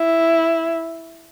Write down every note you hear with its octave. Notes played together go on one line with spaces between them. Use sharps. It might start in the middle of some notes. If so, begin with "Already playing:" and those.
Already playing: E4